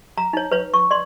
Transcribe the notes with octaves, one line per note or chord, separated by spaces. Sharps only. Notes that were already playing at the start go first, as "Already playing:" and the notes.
A#5
D#4 C#5
B4 C#5
C#6
D5 C6